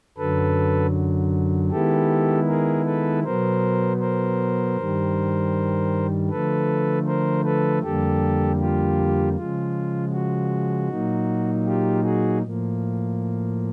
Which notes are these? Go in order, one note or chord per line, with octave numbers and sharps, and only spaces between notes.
F#2 D3 F#3 A4 B4
D#3 G#3 B3 E4 G4 A4
G#4 A#4
A4 B4
B2 F#3 B3 A#4 C5
A#4 C5
G2 D#3 G3
D3 F3 A3 A4 B4
A#4 C5
A4 B4
F2 D3 G3 A#3 G4 A4
F4 G4
C#3 F3 G#3 F4
F#4
A#2 F#3 A#3 D#4
F4 G4
F#4 G#4
A2 F3 A#3